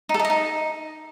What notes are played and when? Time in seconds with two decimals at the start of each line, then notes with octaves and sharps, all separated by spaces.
0.09 D#4
0.14 A4
0.19 D#4
0.25 D#5
0.30 D#4